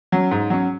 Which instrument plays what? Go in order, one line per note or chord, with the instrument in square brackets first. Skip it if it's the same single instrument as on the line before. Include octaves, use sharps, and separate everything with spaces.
[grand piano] F#3 C#4
G#2
F#3 C#4